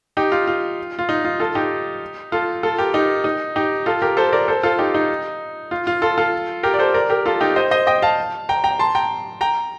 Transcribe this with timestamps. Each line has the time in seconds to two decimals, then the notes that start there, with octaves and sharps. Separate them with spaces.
0.17 D#4 G4
0.32 F4
0.47 F4
0.99 F4
1.09 D#4
1.25 F4
1.40 F4 A4
1.55 D#4 G4
2.32 F4 A4
2.63 F4 A4
2.78 G4 A#4
2.94 D#4 G4
3.24 D#4
3.56 D#4 G4
3.86 F4 A4
4.02 G4 A#4
4.17 A4 C5
4.33 A#4 D5
4.48 A4 C5
4.63 F4 A4
4.79 D#4 G4
4.94 D#4
5.71 F4
5.87 F4
6.02 F4 A4
6.18 F4 A4
6.63 G4 A#4
6.74 D5
6.79 A4 C5
6.94 A#4 D5
7.10 G4 A#4
7.26 F4 A4
7.41 D#4 G4
7.56 C5 D#5
7.71 C5 D#5
7.87 D#5 G5
8.02 F5 A5
8.49 G5 A#5
8.64 G5 A#5
8.79 A5 C6
8.95 G5 A#5
9.41 G5 A#5